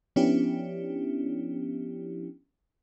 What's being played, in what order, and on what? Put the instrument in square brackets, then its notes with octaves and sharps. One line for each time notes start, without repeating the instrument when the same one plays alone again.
[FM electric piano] F3 B3 C#4 D4 E4 G4